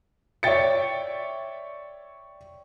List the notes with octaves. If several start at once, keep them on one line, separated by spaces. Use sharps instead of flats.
C#5 D5 E5 G5 A6 C#7